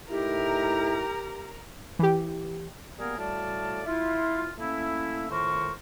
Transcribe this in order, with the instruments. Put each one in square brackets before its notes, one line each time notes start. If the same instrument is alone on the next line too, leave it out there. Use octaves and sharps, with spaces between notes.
[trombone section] A2 D#4 E4 [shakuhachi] G4 [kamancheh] A#4 A#5
[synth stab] E3 G4
[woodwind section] G3 A#3 B3 G#4 A#4
A2 G3 F#4 D5 F5 A5
E4 F4
A3 A#3 C#4 E4
A2 D#3 F4 A#4 C5 C#6